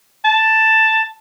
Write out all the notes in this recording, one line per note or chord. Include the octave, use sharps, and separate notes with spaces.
A5